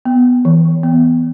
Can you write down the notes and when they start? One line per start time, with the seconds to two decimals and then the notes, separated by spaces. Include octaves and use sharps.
0.05 B3
0.45 E3
0.83 B3